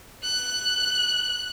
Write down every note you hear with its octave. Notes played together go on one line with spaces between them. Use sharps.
F#6